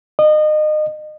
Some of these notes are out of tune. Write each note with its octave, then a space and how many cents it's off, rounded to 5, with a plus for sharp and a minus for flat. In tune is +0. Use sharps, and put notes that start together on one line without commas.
D#5 -30